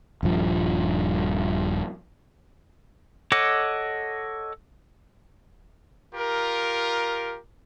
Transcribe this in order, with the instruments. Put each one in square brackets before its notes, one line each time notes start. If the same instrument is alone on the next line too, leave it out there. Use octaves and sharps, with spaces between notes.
[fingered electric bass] D#1 G2 F3
[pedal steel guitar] A4 C#5 D#5 F#5 D6
[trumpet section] F4 G4 A#4